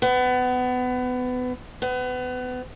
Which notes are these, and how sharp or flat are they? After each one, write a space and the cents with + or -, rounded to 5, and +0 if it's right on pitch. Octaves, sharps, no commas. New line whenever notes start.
B3 +25
B3 +30